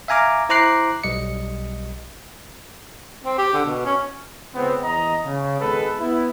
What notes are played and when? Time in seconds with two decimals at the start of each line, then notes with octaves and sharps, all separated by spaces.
0.08 E5 F5 G#5 A#5 D6 F6
0.49 E4 C5 A#5 D6 F#6 C7
1.04 B1 G3 D#5 C#7
3.24 C4
3.38 G4
3.53 D3
3.65 B2
3.85 C#4
4.55 C#2 B3 C4
4.84 E2 D#5 A#5
5.24 C#3
5.60 G#1 G#3 B3 A4 B4
5.99 B3 E4